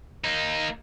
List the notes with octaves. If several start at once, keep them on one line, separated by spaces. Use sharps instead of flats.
A#3 D#4